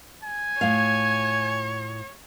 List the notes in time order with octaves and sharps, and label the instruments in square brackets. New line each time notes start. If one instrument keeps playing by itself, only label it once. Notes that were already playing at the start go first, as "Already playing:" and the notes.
[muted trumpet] G#5
[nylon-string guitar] A2 F4 F5 [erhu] C#5